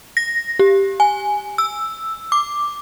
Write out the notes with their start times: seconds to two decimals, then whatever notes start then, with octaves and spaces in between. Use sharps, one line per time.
0.17 A#6
0.59 G4
1.00 G#5
1.58 E6
2.32 D6